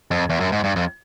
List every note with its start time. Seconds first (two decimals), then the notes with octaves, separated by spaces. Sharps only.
0.11 F2
0.30 E2
0.40 F#2
0.52 G#2
0.64 G2
0.76 F2